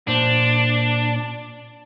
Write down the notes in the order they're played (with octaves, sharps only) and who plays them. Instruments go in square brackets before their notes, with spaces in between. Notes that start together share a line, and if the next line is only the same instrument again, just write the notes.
[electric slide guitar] A#2 C5 [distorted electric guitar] D4